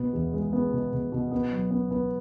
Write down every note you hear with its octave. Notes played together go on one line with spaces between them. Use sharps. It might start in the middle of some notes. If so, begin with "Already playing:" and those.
Already playing: B2 B3
E2
G#3
B3
B2
B2
B2
B3
F#3
B3
B3